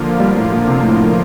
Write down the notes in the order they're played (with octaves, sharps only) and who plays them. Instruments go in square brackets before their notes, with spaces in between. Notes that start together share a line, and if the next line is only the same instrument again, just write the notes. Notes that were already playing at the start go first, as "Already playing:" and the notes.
Already playing: [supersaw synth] D3 F3 A#3 F4
[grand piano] G3
A2
A#2
C3
A2